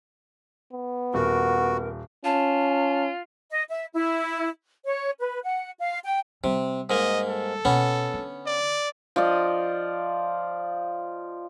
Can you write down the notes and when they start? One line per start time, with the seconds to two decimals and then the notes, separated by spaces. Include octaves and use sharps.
0.73 B3
1.14 D#1 F#4 A#4
2.24 C#4 F4 A5
3.50 D#5
3.69 E5
3.93 E4
4.85 C#5
5.19 B4
5.44 F#5
5.78 F5
6.04 G5
6.44 C3 G3
6.90 G#2 A#3 D#5
7.29 A4
7.65 B2 A#3 B3 C#4
8.14 D3
8.47 D5
9.16 F3 D5 D#5